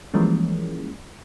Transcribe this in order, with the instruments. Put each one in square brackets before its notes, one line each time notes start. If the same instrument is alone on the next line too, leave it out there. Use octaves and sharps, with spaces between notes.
[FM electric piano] E3 F3 G3 G#3 A#3 C#4